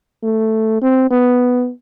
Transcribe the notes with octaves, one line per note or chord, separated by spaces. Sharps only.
A3
C4
B3